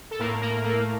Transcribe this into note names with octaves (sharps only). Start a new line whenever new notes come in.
A4
A2 A#3 A#4
A2 A#3 A#4
A3 A#3 A#4